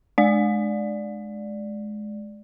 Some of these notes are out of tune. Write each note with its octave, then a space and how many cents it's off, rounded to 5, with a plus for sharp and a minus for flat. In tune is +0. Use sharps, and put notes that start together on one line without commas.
G#3 +25 D5 +0